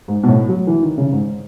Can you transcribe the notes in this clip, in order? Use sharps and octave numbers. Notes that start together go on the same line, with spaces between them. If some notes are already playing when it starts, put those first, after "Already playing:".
G#2
B2
A2
F#3
E3
D#3
C#3
G#2